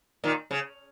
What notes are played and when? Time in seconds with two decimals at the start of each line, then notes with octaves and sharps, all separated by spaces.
0.24 A#2 D#3
0.51 C#3